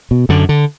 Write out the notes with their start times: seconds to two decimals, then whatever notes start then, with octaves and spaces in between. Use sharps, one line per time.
0.11 B2
0.29 F#2 D3
0.49 D3